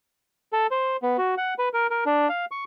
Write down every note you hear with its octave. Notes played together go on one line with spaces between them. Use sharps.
A4
C5
B3
F#4
F#5
B4
A#4
A#4
D4
F5
C#6